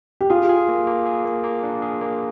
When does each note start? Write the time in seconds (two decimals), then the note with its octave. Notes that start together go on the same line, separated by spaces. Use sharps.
0.21 G4
0.30 F4 G#4
0.49 G#4
0.69 A#3
0.87 A#3
1.06 G#4
1.25 A#3
1.44 A#3
1.63 D4
1.82 G#4
2.01 A#3